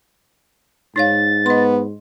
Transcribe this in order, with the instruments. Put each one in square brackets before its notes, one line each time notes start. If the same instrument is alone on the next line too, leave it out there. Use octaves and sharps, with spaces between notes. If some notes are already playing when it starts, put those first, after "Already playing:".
[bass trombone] G#2 [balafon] D#4 C#5 F5 [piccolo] A6
[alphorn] B3 [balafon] D#5 C6